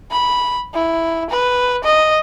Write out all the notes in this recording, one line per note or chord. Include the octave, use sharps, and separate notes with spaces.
B5
E4
B4
D#5